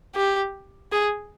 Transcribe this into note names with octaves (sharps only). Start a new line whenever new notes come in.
G4
G#4